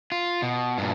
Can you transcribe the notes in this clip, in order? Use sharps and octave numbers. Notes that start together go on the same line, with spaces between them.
F4
B2
G2 A#2